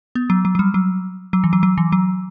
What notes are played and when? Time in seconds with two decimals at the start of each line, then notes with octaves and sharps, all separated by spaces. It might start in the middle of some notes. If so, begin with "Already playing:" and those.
0.15 B3
0.30 F#3
0.45 F#3
0.55 F#3
0.59 G3
0.74 F#3
1.33 F#3
1.44 E3
1.53 F#3
1.63 F#3
1.78 E3
1.92 F#3